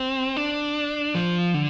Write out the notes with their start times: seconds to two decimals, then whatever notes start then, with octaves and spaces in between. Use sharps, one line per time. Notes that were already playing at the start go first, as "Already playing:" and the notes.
Already playing: C4
0.37 D4
1.15 F3
1.54 D3